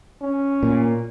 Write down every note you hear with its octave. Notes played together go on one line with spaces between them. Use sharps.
C#4
A#2